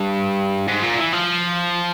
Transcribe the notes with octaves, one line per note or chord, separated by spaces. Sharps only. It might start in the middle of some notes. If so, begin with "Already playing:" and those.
Already playing: G2
G#2
A#2
E3
F3